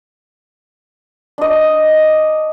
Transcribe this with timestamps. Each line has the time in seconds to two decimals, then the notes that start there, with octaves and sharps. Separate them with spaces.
1.38 D4 D#5